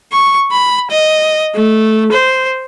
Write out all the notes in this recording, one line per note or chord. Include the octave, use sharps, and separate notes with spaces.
C#6
B5
D#5
A3
C5